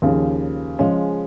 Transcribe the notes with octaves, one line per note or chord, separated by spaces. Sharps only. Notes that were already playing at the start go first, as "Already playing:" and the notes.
D#2 C#3 F3
C#3 F3 G#3 C#4